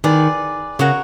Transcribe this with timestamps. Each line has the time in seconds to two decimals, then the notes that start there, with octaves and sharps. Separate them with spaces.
0.04 D#3 G#4 B4 D5
0.79 C#3 F#4 A#4 C#5